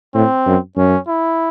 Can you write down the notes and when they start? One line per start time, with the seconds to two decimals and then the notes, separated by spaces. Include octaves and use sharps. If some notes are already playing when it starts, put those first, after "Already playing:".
0.15 A2 C4
0.47 F#2
0.77 F#2 C#4
1.08 E4